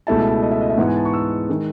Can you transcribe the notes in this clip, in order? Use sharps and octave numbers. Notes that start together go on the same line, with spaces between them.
C#2 B2 A3 E4 A5
D#5
E5
D#5
E5
G#2 E3 B3 E4 F#5
G#5
A5
C#6
E6
D#3 G#3